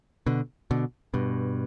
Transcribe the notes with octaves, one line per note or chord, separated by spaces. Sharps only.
B2 D3
B2 D3
G2 B2